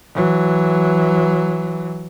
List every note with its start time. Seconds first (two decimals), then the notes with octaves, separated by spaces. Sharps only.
0.14 E3 F#3